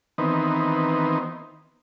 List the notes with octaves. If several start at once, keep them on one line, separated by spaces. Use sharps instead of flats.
D#3 E3 B3 C4 D#4